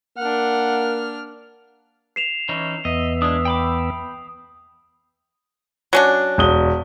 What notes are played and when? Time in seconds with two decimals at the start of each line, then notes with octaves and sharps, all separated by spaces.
0.18 A#3 D4 F#5 F6
2.16 C7 E7 F7
2.49 E3 C#4 D#4
2.85 E2 B3 D#5 E5
3.22 G#3 D4 D#6
3.45 G5 B5 D6
5.93 F#3 C#4 D4
6.38 E1 D#6 G7